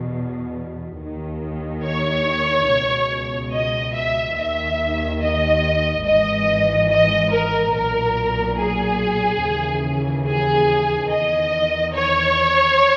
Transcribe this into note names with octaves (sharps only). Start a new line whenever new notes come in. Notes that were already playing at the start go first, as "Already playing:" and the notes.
Already playing: E2 B2
D#2 D#3
C#5
C#2 B2
D#5
E5
D#2 D#3 E5
D#5
G#1 G#2 E3 D#5
D#5
A#4
B1 A#2 A#4
G#4
D#2 C#3 E3
G#4
E2 D#3 D#5
C#5